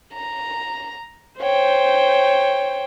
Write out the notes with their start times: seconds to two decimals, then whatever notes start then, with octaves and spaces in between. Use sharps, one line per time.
0.14 A#5
1.41 C5 C#5 G5